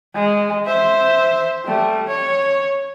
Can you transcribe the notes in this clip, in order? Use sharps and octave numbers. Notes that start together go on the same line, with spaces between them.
G#3
C5 E5
G3 A3
C#5